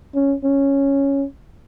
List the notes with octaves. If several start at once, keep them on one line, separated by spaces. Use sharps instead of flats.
C#4
C#4